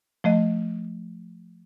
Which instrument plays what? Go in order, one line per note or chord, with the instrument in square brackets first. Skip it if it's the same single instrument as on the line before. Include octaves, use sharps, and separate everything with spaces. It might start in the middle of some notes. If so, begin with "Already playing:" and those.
[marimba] F3 A3 D#5